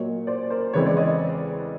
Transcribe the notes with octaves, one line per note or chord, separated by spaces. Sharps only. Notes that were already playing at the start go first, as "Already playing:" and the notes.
Already playing: A#2 F#3 A#3 C#5 D#5
C5 D5
A#4 C5
E2 C#3 E3 G#3 C4 B4 C#5
C5 D5
C#5 D#5